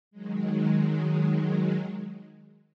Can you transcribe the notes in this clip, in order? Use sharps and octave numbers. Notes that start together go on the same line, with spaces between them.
D#3 F#3 G#3